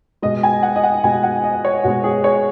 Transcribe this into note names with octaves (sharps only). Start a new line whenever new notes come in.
B2 G#3 D#5
G#5
F#5
D#5
F#5
B2 G#3 G#5
F#5
D#5
C#5
B2 G#3 F#4
G#4
C#5